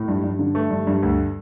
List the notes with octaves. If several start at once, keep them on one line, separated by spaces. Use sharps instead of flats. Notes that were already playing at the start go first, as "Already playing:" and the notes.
Already playing: A2
G2
G2
D3
A3
G2
G2
D2